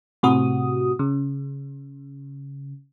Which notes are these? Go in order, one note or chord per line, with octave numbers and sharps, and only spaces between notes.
A2 C3 F#4 D#6
C#3